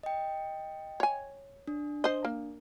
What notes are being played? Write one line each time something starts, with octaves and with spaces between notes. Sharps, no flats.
D#5 G5
C#5 G#5
D4
C5 D#5
A#3